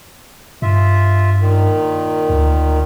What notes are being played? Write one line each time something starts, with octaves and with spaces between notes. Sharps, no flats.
G2 F4 E5
A#2 D#3
D2